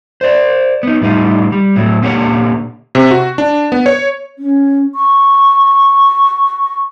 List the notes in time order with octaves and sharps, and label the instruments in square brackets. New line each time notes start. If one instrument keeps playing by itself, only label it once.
[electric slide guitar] C5 D5
B3 D#4
A2 G3 D#4 F4
G3
A2 F#3
A#2 D3 A#3 G4 C#5 F#5
[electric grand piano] C3
F#4
D4
B3
C#5
[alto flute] C#4
C#6